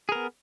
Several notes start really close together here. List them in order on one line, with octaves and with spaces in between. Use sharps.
G#4 A#4 B3